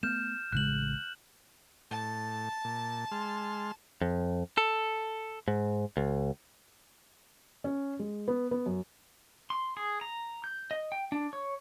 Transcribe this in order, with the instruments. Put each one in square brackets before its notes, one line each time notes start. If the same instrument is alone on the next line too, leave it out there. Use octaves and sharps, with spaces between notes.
[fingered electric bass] A3 B3 [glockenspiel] F6 G6 E7
[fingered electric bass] A1 C#3 G#3 [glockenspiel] F#6 F#7
[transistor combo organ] A2 [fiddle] A5
[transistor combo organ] A#2
G#3 C6 F6
[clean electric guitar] F2
A4
G#2
C#2
[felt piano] C#4
G#3
B3
B3
F#2
[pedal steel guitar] C6
G#4
A#5
G6
D#5
G5
D4
C#5